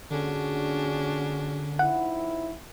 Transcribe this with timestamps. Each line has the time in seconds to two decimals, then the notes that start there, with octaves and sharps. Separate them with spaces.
0.10 A#2 D3 C#4 D4 F#4 G#4
1.79 F2 D#4 E4 F#5